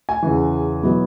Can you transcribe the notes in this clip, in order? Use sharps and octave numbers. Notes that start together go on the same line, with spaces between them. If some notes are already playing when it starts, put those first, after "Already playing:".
G#5
E2 C#3 E3
B2 F#3 B3 E4